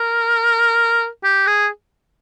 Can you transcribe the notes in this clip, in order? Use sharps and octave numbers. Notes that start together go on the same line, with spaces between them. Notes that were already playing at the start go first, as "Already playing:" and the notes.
Already playing: A#4
G4
G#4